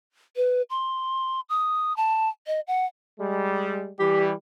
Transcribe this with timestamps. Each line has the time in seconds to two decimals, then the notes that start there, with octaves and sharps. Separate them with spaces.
0.36 B4
0.70 C6
1.49 D#6
1.97 A5
2.47 D#5
2.67 F#5
3.19 G3 G#3
4.00 E3 G3 G4